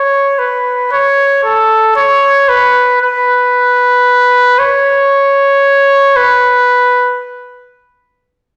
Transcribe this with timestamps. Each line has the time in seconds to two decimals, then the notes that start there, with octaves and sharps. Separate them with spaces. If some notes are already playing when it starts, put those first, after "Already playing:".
Already playing: C#5
0.39 B4
0.92 C#5
1.44 A4
1.96 C#5
2.49 B4
3.01 B4
4.59 C#5
6.16 B4